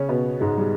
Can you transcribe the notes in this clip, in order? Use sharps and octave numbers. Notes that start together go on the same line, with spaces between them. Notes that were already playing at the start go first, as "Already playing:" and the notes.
Already playing: C#3 C#4
B2 B3
G#2 G#3
G3